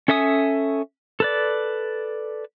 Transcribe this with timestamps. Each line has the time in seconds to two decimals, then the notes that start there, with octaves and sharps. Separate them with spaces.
0.08 C#4 A4 E5 G#5 D#6
1.20 A4 B4 D5